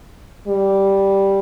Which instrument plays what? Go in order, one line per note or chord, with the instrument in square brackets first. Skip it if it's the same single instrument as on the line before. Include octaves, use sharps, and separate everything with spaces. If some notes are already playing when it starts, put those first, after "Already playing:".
[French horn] G3